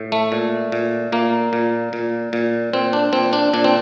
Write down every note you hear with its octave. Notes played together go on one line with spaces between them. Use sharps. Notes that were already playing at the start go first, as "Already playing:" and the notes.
Already playing: A2
A3
A#2
A#2
A#2 A#3
A#2
A#2
A#2
A#2 C4
D4
A#2 C4
D4
A#2 D4
C4